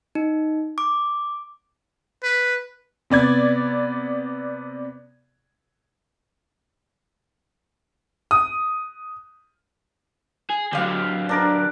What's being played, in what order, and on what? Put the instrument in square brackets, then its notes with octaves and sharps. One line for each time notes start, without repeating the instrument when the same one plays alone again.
[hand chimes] D#4
D6
[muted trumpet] B4
[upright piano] C3 B3 D5 G#6
[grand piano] D#6
[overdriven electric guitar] G#4
[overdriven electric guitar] D3 F#3 [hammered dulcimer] G4 F5
[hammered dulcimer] D4 A#4 D5